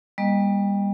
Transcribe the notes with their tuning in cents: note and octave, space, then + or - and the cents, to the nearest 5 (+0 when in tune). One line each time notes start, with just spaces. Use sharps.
G3 +30 A#3 +45 D#5 -15